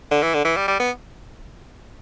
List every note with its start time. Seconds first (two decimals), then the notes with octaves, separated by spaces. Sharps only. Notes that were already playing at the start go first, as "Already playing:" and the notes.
0.11 D3
0.22 E3
0.34 D3
0.45 E3
0.57 G3
0.68 G3
0.80 B3